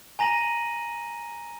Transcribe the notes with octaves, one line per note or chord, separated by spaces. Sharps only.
G#5 A#5 A#6 D#7 F#7